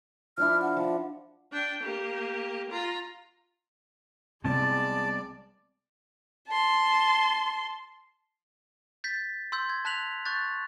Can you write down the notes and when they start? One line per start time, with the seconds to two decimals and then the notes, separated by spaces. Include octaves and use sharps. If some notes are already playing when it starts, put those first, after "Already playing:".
0.38 F3 D4 E4 F6
0.62 F#5
0.77 F3 F4
1.52 D4 G5
1.83 A#3 G4
2.70 F4 A#5
4.44 C2 G3 G#3 B3 C4 D5 A5
6.48 A5 C6
9.04 G6 A6 B6
9.52 C6 E6 G6
9.69 G#6
9.85 A5 F#6 B6 F7 F#7
10.26 C#6 F#6 G6 A6